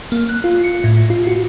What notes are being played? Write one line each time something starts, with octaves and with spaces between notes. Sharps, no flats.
A#3
F#6
F4
C#7
A2
F4
F#4